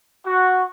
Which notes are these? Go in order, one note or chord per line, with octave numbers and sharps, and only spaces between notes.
F#4